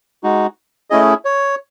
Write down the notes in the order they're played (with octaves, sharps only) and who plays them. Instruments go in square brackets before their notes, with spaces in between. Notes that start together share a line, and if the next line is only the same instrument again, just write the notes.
[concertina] G#3 D#4 F#4
A3 C#4 E4 G#4 D#5
C#5